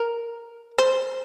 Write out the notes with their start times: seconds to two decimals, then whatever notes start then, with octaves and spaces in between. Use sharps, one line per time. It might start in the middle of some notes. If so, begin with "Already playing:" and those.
Already playing: A#4
0.78 C5